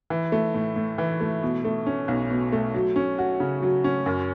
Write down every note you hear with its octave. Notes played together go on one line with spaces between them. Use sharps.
E3
A3
A2
A2
E3
A3
B2
A3
C#4
B1
B2
A3
F#3
C#4
F#4
C#3
F#3
C#4
F#2